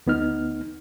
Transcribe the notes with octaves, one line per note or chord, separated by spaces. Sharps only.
D2 B3 D#4 F6